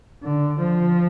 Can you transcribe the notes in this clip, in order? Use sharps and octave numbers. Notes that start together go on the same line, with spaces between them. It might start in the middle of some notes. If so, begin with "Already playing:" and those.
D3
F3